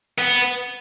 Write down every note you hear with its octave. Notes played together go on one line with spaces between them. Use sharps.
B3